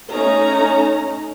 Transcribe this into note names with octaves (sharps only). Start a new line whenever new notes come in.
A3 C#4 D#4 A#5